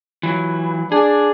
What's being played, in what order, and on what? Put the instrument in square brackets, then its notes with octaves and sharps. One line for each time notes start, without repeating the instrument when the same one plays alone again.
[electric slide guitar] E3 F#3
[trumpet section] D4 [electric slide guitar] G#4